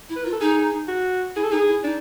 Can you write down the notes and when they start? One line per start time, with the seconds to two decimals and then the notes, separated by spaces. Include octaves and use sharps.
0.09 E4
0.16 B4
0.24 F4 A#4
0.33 A4
0.41 D#4 G#4
0.88 F#4
1.36 E4 G#4
1.44 A4
1.51 D#4 G#4
1.68 E4
1.83 D4 D#4